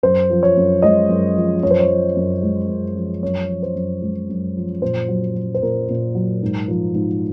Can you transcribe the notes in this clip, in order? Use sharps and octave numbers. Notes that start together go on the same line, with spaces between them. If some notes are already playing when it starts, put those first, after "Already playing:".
F#2 C5
F3
C#5
F#2
G#3 D#5
F#2
F3
F#2 C#5
C5
C#5
F3
F#2
G#3
F#2
F3
F#2 C#5
F3
C5
F#2
G#3
F#2
F3
A#2 C5
F#3
F#3
C5
A#2 A#4
A#2
F#3
G#2
F3
G#2